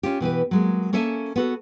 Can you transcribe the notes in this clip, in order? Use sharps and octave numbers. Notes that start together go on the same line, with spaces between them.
C#4 F4 G4
B2 E3 G4 B4
F#3 G#3 A#3
A#3 C#4 A4 E5 G#5 A5
B3 F#4 A4